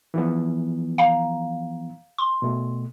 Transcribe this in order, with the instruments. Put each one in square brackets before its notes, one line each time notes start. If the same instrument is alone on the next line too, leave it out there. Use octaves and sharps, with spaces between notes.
[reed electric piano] E3 F3 B3
[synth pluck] F5 A#5
C6
[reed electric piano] B2 A3